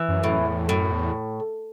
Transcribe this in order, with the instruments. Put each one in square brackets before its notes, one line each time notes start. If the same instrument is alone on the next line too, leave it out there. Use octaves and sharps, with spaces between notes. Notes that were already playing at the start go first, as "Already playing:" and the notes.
Already playing: [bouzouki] E3
[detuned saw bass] F#2
[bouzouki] A2
[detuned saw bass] E2
[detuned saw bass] F#2 [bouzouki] A2
[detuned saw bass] E2